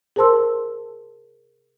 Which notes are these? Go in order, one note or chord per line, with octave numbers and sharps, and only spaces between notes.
G#4 A#4 C5 A5 C6 E6